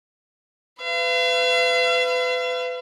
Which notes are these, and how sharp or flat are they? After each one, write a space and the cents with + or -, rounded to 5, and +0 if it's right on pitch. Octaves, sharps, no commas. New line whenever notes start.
B4 +30 F5 -45